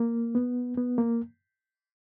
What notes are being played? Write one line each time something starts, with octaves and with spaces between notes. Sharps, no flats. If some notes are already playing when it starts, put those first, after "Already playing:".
Already playing: A#3
B3
B3
A#3